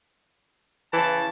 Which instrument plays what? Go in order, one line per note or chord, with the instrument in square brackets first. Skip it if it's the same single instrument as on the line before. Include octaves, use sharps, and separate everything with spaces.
[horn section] C#3 A5 [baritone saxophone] E3